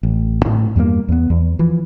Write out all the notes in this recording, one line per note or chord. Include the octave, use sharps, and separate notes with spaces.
A1
A2
E2 G2 F#3 A#3
E2 B3
E2
E3 F3